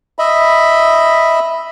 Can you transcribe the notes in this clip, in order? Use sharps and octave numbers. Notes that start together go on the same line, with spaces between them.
D#5 E5 B5